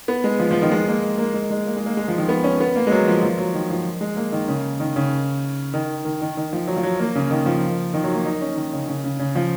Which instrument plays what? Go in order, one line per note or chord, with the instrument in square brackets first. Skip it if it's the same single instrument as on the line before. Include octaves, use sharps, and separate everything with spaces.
[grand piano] B3
G#3
F3
F3
D#3
G#3
A#3
A#3
G#3
G#3
A#3
G#3
A#3
G#3
F3
D#3
B3
C#4
B3
A#3
G#3
F#3
F3
F3
F#3
D#3
F3
G#3
A#3
D#3
C#3
D#3
C#3
D#3
D#3
D#3
D#3
F3
F#3
F3
F#3
A#3
C#3
D#3
F3
D#3
F#3
A#3
D#4
C#4
D#3
C#3
C#3
C#3
C#3
F3